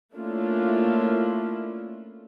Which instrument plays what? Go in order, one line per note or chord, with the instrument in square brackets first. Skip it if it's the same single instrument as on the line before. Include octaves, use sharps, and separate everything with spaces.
[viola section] A3 A#3 C#4 D4 E4 F4